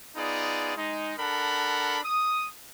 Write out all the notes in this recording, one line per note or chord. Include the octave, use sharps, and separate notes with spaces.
B3 D#4 F4 G#4 D5
G#3 D#4
D4 A4 A#4 F#5 B5
D#6